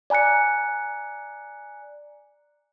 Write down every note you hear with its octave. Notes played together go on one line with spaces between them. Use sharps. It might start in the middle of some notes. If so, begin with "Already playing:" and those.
D5 G#5 A#5 F#6 C#7